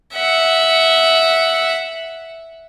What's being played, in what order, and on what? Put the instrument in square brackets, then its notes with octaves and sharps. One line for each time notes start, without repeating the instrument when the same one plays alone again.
[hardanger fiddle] E5 F#5